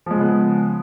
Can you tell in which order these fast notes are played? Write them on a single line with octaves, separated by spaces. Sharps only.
F3 G#3 C#3 B3